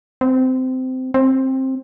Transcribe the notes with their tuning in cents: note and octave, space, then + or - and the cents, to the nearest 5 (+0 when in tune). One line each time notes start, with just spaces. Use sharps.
C4 -20
C4 +15